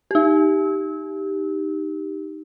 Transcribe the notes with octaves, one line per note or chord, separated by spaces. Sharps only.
D#4 G4